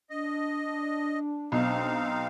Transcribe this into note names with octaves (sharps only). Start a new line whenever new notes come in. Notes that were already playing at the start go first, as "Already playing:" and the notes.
D4 D#5
B1 C4 D#4 F5